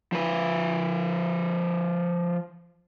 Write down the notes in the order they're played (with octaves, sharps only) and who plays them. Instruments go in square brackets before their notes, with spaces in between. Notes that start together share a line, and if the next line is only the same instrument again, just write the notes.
[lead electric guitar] F3 B4